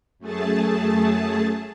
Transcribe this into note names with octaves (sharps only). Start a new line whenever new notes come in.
F#2 A3 G#4 A5